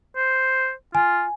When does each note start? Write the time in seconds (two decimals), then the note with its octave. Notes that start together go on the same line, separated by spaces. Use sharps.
0.16 C5
0.95 F4 G#5